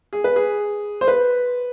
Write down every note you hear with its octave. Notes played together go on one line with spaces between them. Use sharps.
G#4
B4
G#4
C5
B4